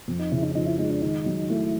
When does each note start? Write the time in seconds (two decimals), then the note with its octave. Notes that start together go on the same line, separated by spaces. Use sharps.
0.08 F2
0.20 D#4
0.32 C#3 E4
0.43 D#4
0.55 F3 D#4
0.66 E4
0.79 G#3 D#4
0.90 D4
1.02 D#3 D#4
1.26 F#3
1.50 A3 E4